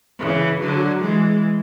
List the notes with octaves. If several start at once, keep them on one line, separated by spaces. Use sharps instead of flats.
C#3 E3
D3 F#3
E3 G#3